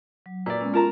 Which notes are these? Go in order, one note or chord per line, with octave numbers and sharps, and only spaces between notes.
F#3
A#2 B4 D5 E6
G#3 B3 C#4
F4 A#4 A5 A#5